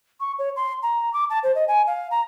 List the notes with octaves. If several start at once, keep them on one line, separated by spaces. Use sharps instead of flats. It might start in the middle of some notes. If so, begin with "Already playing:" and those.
C#6
C#5
C6
A#5
D6
A5
C5
D#5
G#5
F5
A#5